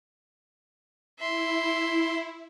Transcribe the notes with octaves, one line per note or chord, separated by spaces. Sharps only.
E4 E5 C6